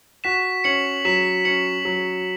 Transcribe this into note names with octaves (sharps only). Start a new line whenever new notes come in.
F#4 B6 E7
C#4 C#7 F#7
F#3 B6 E7
C#4 C#7 F#7
F#3